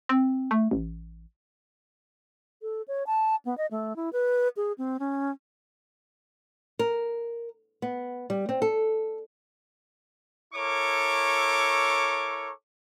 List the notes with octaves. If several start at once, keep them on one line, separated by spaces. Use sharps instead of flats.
C4
A3
A1
A4
C#5
A5
B3
D#5
A3
E4
B4
G#4
C4
C#4
A#4
B3
G3
C4
A4
E4 A4 A#4 C#5 C#6 D6